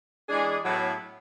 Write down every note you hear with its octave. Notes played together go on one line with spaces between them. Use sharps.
E3 G#3 D4 G#4
A2 F#3 B3